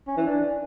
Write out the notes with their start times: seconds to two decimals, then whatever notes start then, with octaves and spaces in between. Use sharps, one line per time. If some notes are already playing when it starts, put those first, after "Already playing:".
0.07 C#4
0.17 E3
0.26 D4